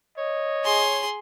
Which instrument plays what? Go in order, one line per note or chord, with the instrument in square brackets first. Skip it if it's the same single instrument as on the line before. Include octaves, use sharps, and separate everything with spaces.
[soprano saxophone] C#5 [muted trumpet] D#5
[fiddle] G#4 C6